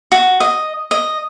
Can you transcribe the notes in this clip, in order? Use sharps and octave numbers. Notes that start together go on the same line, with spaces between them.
F#4
D#5
D#5